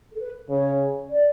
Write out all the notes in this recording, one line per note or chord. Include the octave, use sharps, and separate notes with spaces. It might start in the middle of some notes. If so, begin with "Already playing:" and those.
A4
B4
C#3 C#5
D5